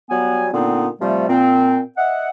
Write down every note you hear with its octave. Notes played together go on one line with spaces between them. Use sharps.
F#3 G3 B3 G#5
A#2 D3 B3 C4 D#4
C3 F3 G3 A3
A#2 C4
D#5 E5 F#5